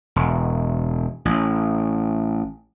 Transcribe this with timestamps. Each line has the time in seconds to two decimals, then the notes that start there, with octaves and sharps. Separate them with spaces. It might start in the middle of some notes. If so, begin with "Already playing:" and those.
0.16 E1
1.25 A1